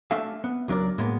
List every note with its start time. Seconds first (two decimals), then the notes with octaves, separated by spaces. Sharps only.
0.11 A3 D4 A4 E5 F5
0.44 B3
0.68 C#2 F#3 D4 A#4 D5
0.98 A2 G#3 A#3 B3